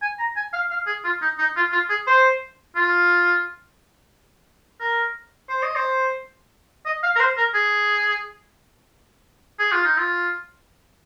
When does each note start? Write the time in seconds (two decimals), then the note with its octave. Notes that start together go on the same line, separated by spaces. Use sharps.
0.02 G#5
0.19 A#5
0.36 G#5
0.53 F5
0.71 F5
0.87 G#4
1.05 F4
1.22 D#4
1.39 D#4
1.56 F4
1.73 F4
1.90 G#4
2.07 C5
2.76 F4
4.81 A#4
5.49 C5
5.63 D#5
5.76 C5
6.86 D#5
7.03 F5
7.16 A#4
7.20 C5
7.37 A#4
7.54 G#4
9.59 G#4
9.72 F4
9.85 D#4
9.98 F4